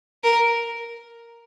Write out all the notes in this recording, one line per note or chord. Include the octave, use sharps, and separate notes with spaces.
A#4